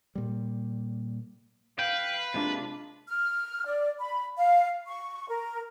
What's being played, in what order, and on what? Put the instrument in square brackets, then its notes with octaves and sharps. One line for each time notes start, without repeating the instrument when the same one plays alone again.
[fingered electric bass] A#2 G3
[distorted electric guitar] B4 [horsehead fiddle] F5 [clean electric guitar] G5
[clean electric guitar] C3 G#3 A#3 [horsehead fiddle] D4 F4
[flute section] F6
D5
B5
F5
C#6
A#4